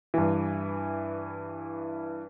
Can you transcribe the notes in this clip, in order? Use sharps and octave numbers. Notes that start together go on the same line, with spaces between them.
G2 E3